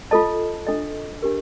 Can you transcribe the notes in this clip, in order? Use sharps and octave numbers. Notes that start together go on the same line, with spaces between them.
F4 A4 D#5 A5
D4 A4 D#5
D4 G4 A#4